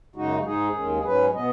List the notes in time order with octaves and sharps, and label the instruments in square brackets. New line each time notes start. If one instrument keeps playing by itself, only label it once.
[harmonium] F#2 C#3 G#3 D#4 F#4
G#2 G#3 D#4 G#4
D#2 D#3 G#3 C#4
G#4
G#2 F#3 C#4 B4
B2 B3 D#5